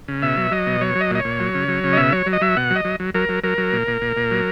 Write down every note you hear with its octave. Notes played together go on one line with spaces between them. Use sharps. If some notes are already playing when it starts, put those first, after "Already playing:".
C#3
B2 E5
F#3
F#3 D#5
B2
F#3 C#5
F#3
D#5
A#2 D#5
C#5
A#2
F#3
C#3
F#3
C#3
D#5
B2 E5
F#3 C#5
F#3
D#5
F#3 E5
B2 F#5
F#3
D#5
F#3
F#3
F#3 A#4
F#3
F#3 A#4
F#3
A#2
A#2
A#2
A#2
F#3